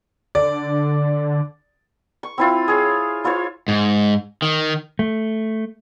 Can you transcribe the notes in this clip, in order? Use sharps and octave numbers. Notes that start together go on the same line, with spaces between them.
D3 D5
C#6
C4 E4 F4
G#4 C#5
E4 F4 C5 C#5
G#2
D#3
A3